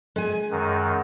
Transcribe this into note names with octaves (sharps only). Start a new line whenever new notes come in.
G#3 G#5
F#2 D#3